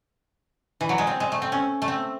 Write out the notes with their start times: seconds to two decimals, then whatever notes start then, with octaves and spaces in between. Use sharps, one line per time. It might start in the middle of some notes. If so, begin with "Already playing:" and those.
0.81 E3
0.89 F#3
0.98 G#3
1.07 C4
1.20 G#3
1.32 A3
1.42 C4
1.52 C#4
1.82 A3
1.88 C4